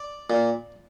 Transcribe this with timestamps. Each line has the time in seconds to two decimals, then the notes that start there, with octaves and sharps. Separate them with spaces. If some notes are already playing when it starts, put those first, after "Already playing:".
Already playing: D5
0.30 A#2